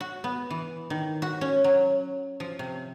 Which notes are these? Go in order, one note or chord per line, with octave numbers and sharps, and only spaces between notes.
F#4
B3
E3
D#3
F#4
C#4
F#3
F3
C3